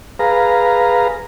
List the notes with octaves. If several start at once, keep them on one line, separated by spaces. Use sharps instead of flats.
G#4 B4 F5 A#5